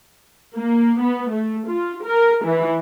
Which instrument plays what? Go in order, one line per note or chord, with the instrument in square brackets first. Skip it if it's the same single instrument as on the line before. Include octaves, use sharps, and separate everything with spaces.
[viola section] A#3
B3
A3
F4
A#4
E3